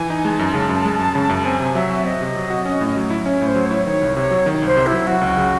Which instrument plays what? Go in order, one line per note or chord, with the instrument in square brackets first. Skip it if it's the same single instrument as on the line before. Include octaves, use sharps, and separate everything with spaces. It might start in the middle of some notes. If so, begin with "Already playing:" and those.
Already playing: [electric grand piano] E3 [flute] G#5
[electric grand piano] D#4
[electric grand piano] G#3 [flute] A5
[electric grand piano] F#2
C#3
F#2
G#3
F#2
C#3
F#2
[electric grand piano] C4 [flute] G#5
[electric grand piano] C3
[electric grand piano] F#3 [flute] E5
[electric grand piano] F#4
[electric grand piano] C4 [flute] D#5
[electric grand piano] C3
F#3
F#4
C#4
A2
F#3
E4
[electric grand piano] C#4 [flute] C#5
[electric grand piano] A2 [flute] C5
[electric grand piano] F#3
[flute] C#5
[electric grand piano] E4
[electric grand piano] D#3 [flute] C#5
[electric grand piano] C2
[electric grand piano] C3 [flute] C#5
[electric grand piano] F#3
D#3
[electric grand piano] C2 [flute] C5
[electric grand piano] C3
[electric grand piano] F#3 [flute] E4
[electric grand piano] F#3 [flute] F#4
[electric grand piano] C#2
C#3